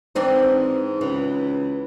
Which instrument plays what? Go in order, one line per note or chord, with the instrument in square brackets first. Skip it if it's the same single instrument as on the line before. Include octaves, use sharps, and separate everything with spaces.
[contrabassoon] G#2 [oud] E3 C4 D4
[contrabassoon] C#2 [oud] E3